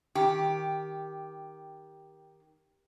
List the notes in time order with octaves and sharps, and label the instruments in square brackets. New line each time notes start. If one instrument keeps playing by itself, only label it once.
[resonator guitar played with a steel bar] D#3 G4